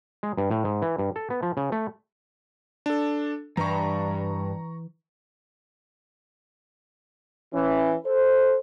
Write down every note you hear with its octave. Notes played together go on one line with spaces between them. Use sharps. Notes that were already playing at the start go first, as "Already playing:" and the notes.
G#3
G2
A2
G#2
E3
G2
A4
B3
F3
C#3
A3
D4 A4
G2 E3 A#5 C#6
E3 C#4
A4 C5